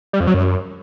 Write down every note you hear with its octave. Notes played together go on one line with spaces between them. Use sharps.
G3
F2
F#3
F#2